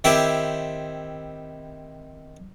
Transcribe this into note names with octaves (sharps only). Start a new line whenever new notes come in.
D#3 C4 E4 G4